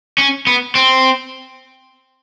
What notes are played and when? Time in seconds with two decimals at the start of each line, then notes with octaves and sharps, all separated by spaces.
0.18 C#4
0.47 B3
0.75 C4